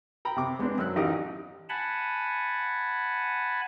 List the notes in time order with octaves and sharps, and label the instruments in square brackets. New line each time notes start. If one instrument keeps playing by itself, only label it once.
[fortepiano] G5 A#5 B5
C3 C4 D6
G#3 B3 C4 D4
F#2 A#4 E6 F#6
A1 D#4 G4 D#6
[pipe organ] F#5 G#5 A5 B5